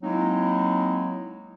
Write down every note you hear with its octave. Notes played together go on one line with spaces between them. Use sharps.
F#3 G#3 A#3 C4 D#4 E4